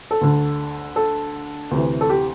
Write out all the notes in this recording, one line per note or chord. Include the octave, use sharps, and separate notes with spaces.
A4
D2 D3
A4
D2 C3 E3
A4
G4